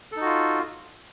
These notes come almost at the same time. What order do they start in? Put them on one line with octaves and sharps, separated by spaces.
A4 D#4 F#4 F4